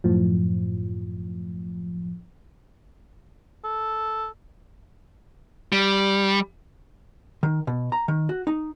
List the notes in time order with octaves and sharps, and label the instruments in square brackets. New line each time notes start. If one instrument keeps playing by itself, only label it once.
[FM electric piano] F#2 A2 F3
[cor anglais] A4
[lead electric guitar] G3
[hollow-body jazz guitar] D#3
B2
A#5
D#3
F#4
D#4